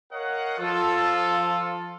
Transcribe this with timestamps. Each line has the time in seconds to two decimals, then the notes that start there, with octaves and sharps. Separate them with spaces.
0.12 A#4 C#5 D#5 F5 F#5
0.58 F3 F4 A4